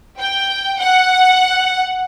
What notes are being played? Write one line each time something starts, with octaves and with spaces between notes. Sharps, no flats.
G5
F#5